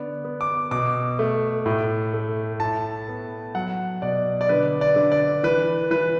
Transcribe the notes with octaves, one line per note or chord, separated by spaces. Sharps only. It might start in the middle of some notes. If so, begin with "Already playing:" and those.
Already playing: D3 B3 D5
B3
D6
B2 D6
A3
A2
A3
A2 A5
B3
F#3 F#5
B2 D5
D5
D3 B4
D5
D3
D5
E3 B4
E3 B4